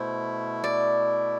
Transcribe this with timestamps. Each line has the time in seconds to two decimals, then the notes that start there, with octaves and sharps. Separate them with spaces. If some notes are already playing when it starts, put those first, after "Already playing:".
Already playing: B2 A3 E4 C5
0.64 D5